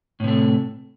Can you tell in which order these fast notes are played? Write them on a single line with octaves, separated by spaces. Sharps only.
A2 C3 A3